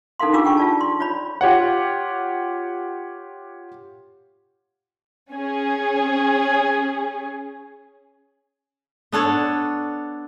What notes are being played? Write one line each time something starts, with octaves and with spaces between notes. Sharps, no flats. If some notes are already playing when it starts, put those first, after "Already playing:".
C#4 D#4 A4 A#4 F5 C6
D4 F4 G4 G#4 D6 E6
A4 G5 C#6
F4 D5 A5
C6
F4 C#5 D5 B5
F4 G4 C#5 F#5
C#4 G#4
B3 D4 A4 C#5